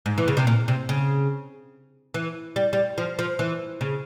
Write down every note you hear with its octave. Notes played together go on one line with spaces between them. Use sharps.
G#2
E3
C#3
C3
A#2
C3
C#3
E3
G3
G3
F3
F3
E3
C#3